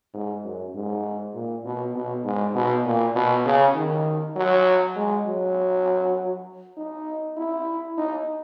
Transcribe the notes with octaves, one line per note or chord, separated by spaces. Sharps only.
G#2
F#2
G#2
A#2
B2
B2
G#2
B2
A#2
B2
C#3
D#3
F#3
G#3
F#3
D#4
E4
D#4